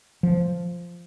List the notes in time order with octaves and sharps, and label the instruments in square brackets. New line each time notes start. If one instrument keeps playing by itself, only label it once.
[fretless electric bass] F3